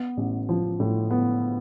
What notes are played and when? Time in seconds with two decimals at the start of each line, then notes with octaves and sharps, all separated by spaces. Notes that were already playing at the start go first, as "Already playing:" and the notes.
Already playing: B3
0.17 A1
0.49 F3
0.80 A2
1.11 B3